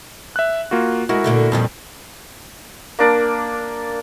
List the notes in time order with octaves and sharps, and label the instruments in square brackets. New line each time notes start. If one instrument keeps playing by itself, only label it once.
[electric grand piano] E5 F#6
A#3 F4 F#4
[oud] G#3 [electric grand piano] E4 F#4 A#4
[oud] A#2 D3 A3
[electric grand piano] F2 [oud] A#2 D#3 G3
[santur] A#3 D4 D5